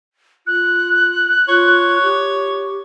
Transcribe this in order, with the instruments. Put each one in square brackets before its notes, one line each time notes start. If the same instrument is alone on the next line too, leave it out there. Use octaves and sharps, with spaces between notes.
[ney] F4 [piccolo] F#6
[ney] F4 [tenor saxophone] C#5
[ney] G4